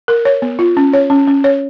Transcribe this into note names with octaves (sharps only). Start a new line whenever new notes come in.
A#4
C#5
B3
F4
C#4
C#5
C#4
C#4
C#5